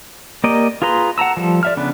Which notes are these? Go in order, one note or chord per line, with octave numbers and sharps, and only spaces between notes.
A#3 G4 A#4 D5 D#5
F4 G#4 B4 A#5 C6
F#5 A5 A#5 E6
F3 G3 A4
D5 E5 F6
C#3 B3 D4 B4